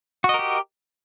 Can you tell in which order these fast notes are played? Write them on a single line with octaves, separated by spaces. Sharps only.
F#4 D#5 A#4 G4